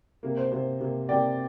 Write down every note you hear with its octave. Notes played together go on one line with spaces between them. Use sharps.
C3 A#3
C5
C3 A#3 C5
C3 A#3
C3 A#3 D5 G5